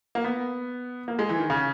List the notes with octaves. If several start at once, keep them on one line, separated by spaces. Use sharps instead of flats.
A#3
B3
A#3
G#3
E3
D#3
C#3